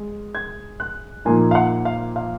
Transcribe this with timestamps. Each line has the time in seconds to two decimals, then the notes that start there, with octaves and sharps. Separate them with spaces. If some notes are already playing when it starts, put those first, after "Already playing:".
Already playing: G#3
0.35 G#6
0.80 F#6
1.25 A#2 F3 A#3 D#4 G#5
1.51 F5
1.55 F#5
1.85 F5
2.16 F5